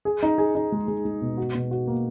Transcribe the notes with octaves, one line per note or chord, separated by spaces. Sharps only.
G#4
D#4
G#4
D#4
G#3
G#3
G#3
B2
F#4
B2
F#4
A#3